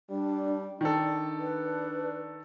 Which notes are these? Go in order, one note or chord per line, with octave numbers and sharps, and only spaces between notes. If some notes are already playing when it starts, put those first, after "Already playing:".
G3 D4
D#3 D4 A4 G5
B4